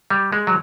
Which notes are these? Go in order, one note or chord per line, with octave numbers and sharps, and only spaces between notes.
G3
G#3
F#3